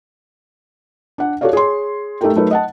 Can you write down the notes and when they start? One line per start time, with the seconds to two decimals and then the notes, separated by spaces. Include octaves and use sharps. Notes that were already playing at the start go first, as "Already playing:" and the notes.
1.18 D4 F#5
1.41 F#4 G4 A4 C#5 D5 F5
1.53 G#4 C#5 C6
2.21 A3 D#4 G4 A4 A#4 G5
2.36 F#3 A3 D#4 A#4 B4
2.51 D#5 F#5 A5